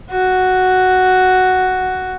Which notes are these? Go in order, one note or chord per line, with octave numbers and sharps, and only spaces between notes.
F#4